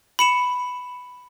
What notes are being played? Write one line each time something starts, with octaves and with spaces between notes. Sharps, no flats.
B5 C#7 E7